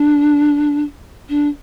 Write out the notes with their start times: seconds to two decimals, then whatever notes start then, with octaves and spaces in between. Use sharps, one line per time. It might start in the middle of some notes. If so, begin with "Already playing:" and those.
Already playing: D4
1.29 D4